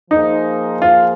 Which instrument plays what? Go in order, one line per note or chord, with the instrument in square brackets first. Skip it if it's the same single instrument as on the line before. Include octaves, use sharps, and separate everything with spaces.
[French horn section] F3 A#3 G#4 C5 [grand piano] D#4
[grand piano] F4